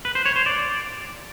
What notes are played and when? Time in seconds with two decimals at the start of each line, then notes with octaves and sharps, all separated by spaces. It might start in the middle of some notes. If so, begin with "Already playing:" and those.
0.05 B4
0.15 C5
0.26 C#5
0.36 C5
0.46 D5